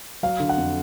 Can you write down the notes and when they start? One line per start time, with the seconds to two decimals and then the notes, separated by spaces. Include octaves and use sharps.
0.23 F#3 F5
0.40 D3
0.49 F#5
0.58 F2